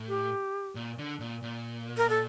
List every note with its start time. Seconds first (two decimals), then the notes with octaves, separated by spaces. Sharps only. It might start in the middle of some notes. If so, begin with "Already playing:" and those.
Already playing: A2
0.08 G4
0.75 A#2
0.98 D3
1.20 A#2
1.43 A#2
1.97 A#4
2.09 A4